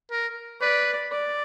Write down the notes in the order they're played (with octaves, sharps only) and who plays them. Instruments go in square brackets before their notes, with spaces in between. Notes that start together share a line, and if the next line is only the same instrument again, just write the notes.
[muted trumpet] A#4
[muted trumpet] B4 [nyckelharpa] D5
[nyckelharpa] D5